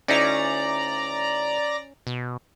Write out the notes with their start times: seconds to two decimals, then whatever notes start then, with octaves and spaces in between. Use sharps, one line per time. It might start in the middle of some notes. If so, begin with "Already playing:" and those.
0.08 D2 C#4 D#4 E4 D5 A#5
2.07 B2